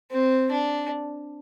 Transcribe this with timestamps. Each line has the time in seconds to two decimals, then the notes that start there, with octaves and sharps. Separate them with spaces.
0.11 C4
0.52 D4